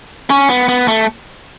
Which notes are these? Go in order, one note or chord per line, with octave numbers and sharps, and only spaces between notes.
C#4
B3
B3
A3